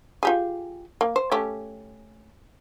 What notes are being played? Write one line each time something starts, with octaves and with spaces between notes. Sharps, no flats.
F4 G4 G#4
A#3
C5
A3 C#4 G4